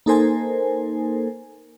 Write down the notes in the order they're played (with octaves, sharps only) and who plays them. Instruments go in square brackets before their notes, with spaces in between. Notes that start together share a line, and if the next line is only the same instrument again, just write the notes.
[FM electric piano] A#3 D#4 A4 A#4 C5 G#5